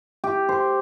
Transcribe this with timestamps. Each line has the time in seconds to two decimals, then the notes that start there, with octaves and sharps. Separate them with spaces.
0.24 G4
0.49 C5